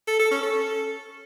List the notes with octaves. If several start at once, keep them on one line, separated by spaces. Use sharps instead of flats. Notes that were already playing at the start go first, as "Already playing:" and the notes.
A4
A4
C#4
A4